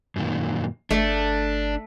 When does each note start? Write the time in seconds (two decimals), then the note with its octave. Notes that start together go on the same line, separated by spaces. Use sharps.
0.16 F#2 A#2 D#3
0.91 G1 A3 D4